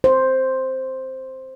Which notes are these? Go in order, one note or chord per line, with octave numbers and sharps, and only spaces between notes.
C5